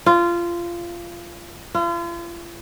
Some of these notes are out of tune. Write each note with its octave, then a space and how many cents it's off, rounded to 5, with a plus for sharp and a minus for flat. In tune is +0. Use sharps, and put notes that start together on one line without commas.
F4 -20
F4 -40